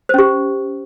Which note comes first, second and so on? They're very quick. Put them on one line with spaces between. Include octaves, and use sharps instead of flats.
C5 C#4 G4